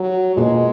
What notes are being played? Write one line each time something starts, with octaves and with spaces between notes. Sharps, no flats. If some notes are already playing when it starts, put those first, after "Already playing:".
Already playing: F#3
B2 G#3 A#3 F4 G#4